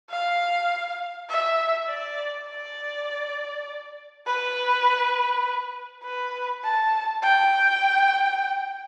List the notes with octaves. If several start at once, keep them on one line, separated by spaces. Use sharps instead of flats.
F5
E5
D5
D5
B4
B4
A5
G5